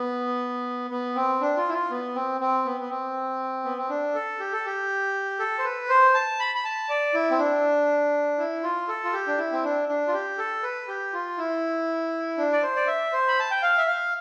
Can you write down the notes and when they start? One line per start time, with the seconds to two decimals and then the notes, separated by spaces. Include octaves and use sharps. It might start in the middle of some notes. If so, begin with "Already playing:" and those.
Already playing: B3
0.91 B3
1.16 C4
1.41 D4
1.57 F4
1.69 E4
1.74 F4
1.91 B3
2.15 C4
2.41 C4
2.65 B3
2.81 B3
2.90 C4
3.65 B3
3.77 C4
3.90 D4
4.15 A4
4.40 G4
4.53 A4
4.66 G4
5.39 A4
5.59 C5
5.64 B4
5.89 C5
6.14 A5
6.40 B5
6.55 B5
6.65 A5
6.89 D5
7.14 E4
7.31 C4
7.39 D4
8.39 E4
8.63 F4
8.89 A4
9.04 F4
9.13 G4
9.27 D4
9.38 E4
9.52 C4
9.64 D4
9.88 D4
10.08 F4
10.13 G4
10.38 A4
10.63 B4
10.88 G4
11.13 F4
11.38 E4
12.38 D4
12.53 D5
12.63 C5
12.76 D5
12.87 E5
13.13 C5
13.28 B5
13.39 A5
13.51 G5
13.62 F5
13.78 E5
13.87 F5